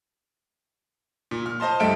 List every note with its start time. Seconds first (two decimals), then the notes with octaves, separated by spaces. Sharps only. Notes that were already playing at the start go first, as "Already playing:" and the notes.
1.31 A#2
1.46 F6
1.60 C5 D#5 A5 C6
1.80 C#2 G2 A4 E5 F6 D7